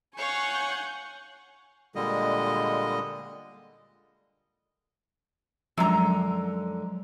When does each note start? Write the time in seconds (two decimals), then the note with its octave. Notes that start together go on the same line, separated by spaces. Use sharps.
0.17 C#5 F5 F#5 G#5 C#6 G6
1.95 A#2 D3 G3 G#3 D#5
5.78 F#2 D3 F3 F#3 G#3 A#5